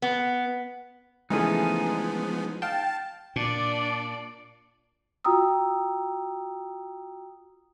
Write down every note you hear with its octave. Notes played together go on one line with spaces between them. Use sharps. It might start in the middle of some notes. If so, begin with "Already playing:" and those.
B3
C#3 E3 F3 G#3 A3 B3 D#4 G#4
F5 G5 A5
A#2 D4 D5
F4 F#4 G5 A#5 D#6 E6